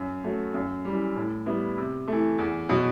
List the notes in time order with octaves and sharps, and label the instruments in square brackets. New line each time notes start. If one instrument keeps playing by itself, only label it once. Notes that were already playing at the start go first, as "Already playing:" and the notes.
Already playing: [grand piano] F#2
F#3 A3
F#2
E3 G3
A2
G3 B3 E4
C3
E3 A3
E2
B2 F#3